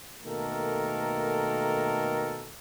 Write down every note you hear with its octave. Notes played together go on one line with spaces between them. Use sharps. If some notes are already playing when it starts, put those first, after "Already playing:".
B2 D#3 A3 A#3 A4 A#4